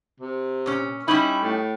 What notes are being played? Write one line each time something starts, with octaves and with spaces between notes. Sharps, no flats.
C3
A#2 C#4
G3 C#4 D#4 E4
A2